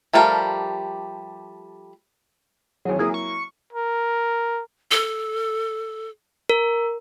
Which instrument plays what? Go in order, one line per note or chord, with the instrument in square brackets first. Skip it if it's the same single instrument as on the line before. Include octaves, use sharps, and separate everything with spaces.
[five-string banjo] F3 G3 A3 G4 A#4
[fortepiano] G#1 E3 G#4 [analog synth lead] F#3
[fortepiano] F#3 A#3 E4 [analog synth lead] G#4
[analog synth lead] C#6
[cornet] A#4
[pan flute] A4
[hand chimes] A#4